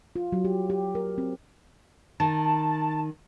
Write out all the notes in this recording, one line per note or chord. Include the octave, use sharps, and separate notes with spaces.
F4
F#3
G4
G4
A#4
C4
D#3 A5